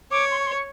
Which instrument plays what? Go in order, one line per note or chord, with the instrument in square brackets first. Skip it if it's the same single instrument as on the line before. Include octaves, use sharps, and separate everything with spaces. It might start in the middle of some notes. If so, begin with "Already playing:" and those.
[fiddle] C#5 [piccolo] D6
[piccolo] C6
C#6
C6
C#6